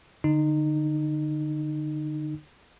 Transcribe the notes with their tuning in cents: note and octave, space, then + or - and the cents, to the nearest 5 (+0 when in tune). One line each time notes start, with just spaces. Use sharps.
D3 +10 D#4 -20